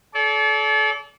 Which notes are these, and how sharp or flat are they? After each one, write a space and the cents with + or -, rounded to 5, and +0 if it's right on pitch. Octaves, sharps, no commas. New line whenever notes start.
A4 -35 D5 -35